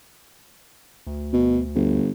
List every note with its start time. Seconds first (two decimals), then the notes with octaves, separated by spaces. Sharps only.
1.07 D2
1.33 B2
1.75 G1